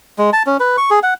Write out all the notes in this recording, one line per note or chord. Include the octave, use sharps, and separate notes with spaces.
G#3
A5
C#4
B4
C#6
G#4
F#5